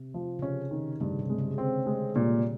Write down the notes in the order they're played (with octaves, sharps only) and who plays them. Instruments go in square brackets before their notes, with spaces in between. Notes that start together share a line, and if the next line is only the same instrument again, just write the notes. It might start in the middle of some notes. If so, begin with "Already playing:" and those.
Already playing: [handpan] C3
[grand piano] F3
[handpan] C#3
[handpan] C3 [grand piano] C#4
[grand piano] D#3
[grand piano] G2 [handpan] C#3
[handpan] C3
[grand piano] G#3
[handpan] C#3
[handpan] D3 [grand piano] C4
[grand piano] G#3
[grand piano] A#2 [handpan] G3